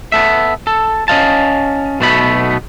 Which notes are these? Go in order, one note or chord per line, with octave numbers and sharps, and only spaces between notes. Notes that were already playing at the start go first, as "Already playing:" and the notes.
B3 A4 E5
A4
C#4 D#5 F5 A5
B1 B2 A3 B3 B5